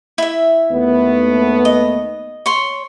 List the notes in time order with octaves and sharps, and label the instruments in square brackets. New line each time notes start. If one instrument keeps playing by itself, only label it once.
[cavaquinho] E4 E5
[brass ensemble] D#2 A3 B3
[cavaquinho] D#5
C#5 C6